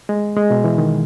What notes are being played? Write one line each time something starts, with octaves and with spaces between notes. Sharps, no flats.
G#3
G#3
B2
E3
D#3